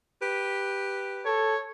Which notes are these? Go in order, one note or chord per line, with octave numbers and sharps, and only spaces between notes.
G4 B4
A4 C#5